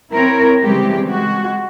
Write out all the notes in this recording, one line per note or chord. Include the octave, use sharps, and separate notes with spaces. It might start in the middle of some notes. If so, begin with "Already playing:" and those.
C4 E4 A#4 C#5
C#3 E3 G3 G#3 C4 G4
G#3 F#4